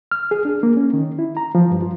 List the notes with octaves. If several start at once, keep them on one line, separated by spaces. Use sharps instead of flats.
F6
G#4
D4
A#3
C#4
D#3
E4
A#5
F3
G2
F4